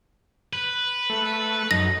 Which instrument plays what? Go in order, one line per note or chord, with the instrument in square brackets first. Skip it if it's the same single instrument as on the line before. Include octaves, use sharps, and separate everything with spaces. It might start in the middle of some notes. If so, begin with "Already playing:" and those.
[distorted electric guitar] B4
[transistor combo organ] A3
[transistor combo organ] F#2 D#4 [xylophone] A#6